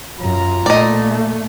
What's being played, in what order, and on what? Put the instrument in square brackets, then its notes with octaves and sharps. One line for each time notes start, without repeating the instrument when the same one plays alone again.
[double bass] F#2 [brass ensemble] F4 A#5
[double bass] A#2 [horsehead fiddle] A3 [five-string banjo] D5 D#5